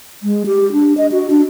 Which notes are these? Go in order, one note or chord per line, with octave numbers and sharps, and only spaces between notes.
G#3
G4
D4
D#5
F#4
D4